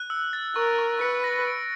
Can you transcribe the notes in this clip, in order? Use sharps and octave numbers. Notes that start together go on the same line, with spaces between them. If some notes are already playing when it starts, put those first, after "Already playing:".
Already playing: F#6
E6
A6
A#4 C#6
C#6
B4 C#7
A#6
D7